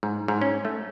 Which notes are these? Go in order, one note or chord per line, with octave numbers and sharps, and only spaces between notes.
G#2
G#2
C#4
A3